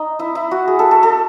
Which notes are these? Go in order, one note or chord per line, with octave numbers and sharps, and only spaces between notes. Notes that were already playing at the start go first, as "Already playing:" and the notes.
Already playing: D#4
E4
E4
F#4
G#4
A4
A4
A4